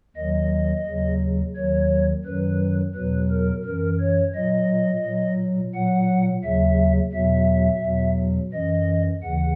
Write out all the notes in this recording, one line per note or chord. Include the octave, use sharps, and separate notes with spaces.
D#2 D#3 F#3 D#5
D#2 C#3 F#3
D#2 D#3 F#3 C#5
F#2 D#3 F#3 B4
E2 B2 F#3 B4
A#4
F#2 E3 A#4
C#5
A#2 F#3 D#5
A#2 F#3
A#2 F#3 F#5
D#2 C#3 F#3 E5
E2 B2 F#3 E5
E2 B2 F#3
F#2 E3 D#5
D#2 C#3 E3 F#5